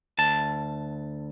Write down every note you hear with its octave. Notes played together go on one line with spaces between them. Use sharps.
D2 A5